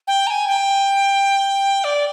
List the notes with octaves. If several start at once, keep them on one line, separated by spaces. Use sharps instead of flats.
G5
A#5
G#5
G5
D5